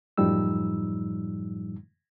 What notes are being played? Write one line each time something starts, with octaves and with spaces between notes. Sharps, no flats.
F#2 A2 F3 G3 D#4 E6